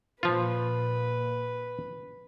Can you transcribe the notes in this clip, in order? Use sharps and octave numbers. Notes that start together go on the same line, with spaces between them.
A#2 F3 F4 B4